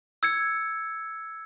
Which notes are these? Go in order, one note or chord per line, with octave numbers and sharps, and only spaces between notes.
E6 G#6 C#7